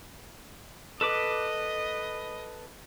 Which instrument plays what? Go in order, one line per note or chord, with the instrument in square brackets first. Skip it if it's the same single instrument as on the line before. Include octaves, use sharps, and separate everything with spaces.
[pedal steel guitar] A4 B4 D6 [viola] D#5